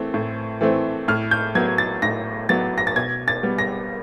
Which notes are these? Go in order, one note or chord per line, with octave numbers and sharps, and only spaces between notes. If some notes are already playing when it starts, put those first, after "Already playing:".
Already playing: E3 A3 C4
A2
E3 A3 C4
A2 F6
G6
F#3 B3 G#6
A6
A2 A#6
F#3 B3 A6
A#6
A6
B2 G#6
A6
G3 B3
A#6